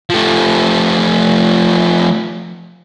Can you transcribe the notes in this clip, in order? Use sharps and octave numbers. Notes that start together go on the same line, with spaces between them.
F3 A3